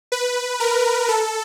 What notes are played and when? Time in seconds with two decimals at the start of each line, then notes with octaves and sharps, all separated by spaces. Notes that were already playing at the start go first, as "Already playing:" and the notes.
0.12 B4
0.60 A#4
1.08 A4